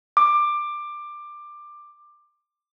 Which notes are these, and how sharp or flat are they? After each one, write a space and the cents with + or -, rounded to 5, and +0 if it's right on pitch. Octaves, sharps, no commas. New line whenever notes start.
D6 +15